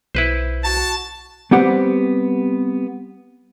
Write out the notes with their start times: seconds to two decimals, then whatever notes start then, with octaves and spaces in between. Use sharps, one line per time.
0.15 B1 E4 B4 C5
0.63 F#4 A5
1.51 G3 B3 C4 G4 F#5